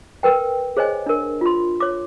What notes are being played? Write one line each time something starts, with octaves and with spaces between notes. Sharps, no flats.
A#4 B4 G5
G#4 C5 C#5 D#5 G#5
D4 A#4
F4 C6
C#5 D6